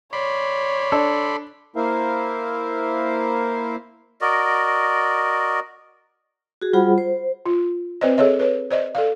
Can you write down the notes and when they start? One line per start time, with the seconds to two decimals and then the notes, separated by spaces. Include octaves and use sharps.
0.13 C#5 D5 B5 C6
0.92 D4 A4
1.76 A#3 E4 A#4 C5 E5 F5
4.21 F#4 A#4 D5 D#5
6.62 F#4 G#4
6.73 G3 F4 G#4 C5 F#5 B5
6.98 C5
7.46 F4
8.01 C4 B4 C5 D5 D#5
8.17 G#4 A4 C#5 D#5 E5
8.39 B4 C#5
8.71 C5 D5 D#5
8.95 A4 D5 F5